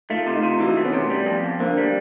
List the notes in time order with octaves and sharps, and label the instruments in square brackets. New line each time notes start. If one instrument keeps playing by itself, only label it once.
[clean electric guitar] A3 [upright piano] D#4 F4
[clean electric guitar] C3
[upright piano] D#4 F4
[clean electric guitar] C3
[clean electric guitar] E3 [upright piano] E4 F#4
[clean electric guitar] A3
[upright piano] B3 C#4
[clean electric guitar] C3
G3
F2
F2
[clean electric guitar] D3 [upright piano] A#3 C4
[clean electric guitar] G3